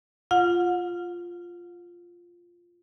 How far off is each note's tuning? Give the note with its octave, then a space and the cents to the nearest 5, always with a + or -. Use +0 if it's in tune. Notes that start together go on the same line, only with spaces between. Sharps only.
F4 +0 F#5 -35